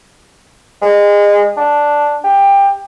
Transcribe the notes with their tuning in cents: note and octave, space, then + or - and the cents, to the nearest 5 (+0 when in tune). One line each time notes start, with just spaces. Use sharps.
G#3 -25
D4 +0
G4 +20